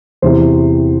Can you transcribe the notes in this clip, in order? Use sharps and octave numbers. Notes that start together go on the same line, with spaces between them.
E2 C3 E3 C5